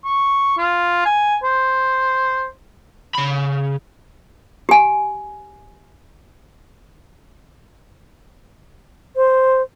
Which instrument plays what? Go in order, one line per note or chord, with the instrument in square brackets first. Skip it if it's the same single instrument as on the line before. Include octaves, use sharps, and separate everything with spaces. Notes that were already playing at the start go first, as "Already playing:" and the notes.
[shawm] C#6
F4
G#5
C5
[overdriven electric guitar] C#3 B5
[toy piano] G4 G#5
[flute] C5